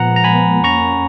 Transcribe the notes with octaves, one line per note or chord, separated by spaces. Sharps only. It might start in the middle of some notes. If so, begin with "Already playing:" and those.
Already playing: A#2 F3 G#3 B3 F#5 A#5
A#5
G#5 B5
F2 F3 A#3 C#4 A#5 C#6